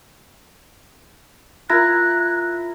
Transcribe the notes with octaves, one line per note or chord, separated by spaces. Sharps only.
E4 F4 A#4 A#5 F#6 A#6